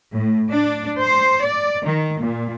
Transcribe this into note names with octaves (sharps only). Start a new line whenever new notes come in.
A2
D4
C5
D5
D#3
A#2